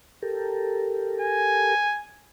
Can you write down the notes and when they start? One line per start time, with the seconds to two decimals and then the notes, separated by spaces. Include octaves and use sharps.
0.22 G4 A4 A#4
1.21 G#5